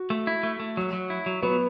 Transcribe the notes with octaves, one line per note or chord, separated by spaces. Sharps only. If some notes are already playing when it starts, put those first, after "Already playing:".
Already playing: F#4
A3
E4
A3
A3
F#3
F#3
E4
F#3
F#3 B3